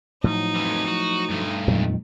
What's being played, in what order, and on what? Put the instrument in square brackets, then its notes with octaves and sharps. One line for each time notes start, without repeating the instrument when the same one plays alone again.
[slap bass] A2 F3 F#3 [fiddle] D#4
[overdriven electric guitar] F2 E3
F#4
G2 A3
[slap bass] F2 D#3 [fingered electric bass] A#2 F#3 G#3